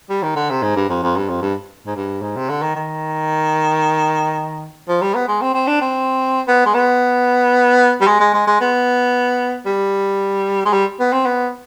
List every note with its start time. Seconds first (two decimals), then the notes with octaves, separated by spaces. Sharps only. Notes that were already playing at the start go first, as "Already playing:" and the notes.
0.10 G3
0.23 D#3
0.36 D3
0.50 C3
0.62 G#2
0.76 G2
0.89 F2
1.03 F2
1.16 G2
1.29 F2
1.42 G2
1.87 G#2
1.96 G2
2.22 G#2
2.36 C3
2.49 D3
2.62 D#3
2.76 D#3
4.88 F3
5.02 G3
5.14 B3
5.28 G#3
5.41 C4
5.54 C4
5.67 D4
5.81 C4
6.48 B3
6.66 G#3
6.74 B3
8.01 G3
8.07 G#3
8.20 G#3
8.34 G#3
8.47 G#3
8.61 B3
9.66 G3
10.66 G#3
10.73 G3
11.00 B3
11.12 C4
11.26 B3